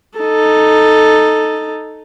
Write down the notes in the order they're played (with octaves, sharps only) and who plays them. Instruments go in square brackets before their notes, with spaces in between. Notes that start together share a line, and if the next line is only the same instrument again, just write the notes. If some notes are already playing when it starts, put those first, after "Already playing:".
[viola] D#4 A4